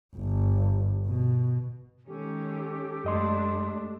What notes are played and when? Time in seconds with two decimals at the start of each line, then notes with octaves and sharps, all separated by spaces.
0.17 G1
1.07 B2
2.07 D#3 G#3 C#4 G4 A4
3.04 F#2 G#3 A3 D4 D#5 C6